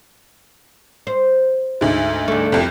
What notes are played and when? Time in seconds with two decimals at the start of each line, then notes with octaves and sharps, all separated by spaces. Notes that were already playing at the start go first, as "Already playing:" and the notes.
1.07 C5
1.81 D2 G#2
2.28 D3 A3
2.52 C2 F2